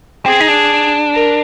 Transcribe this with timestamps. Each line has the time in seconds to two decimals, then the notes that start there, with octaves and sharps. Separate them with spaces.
0.26 C4 G#4
0.40 D#4
0.48 D4
1.13 A#4